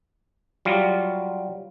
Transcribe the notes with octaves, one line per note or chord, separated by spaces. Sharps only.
F#3 G3 F4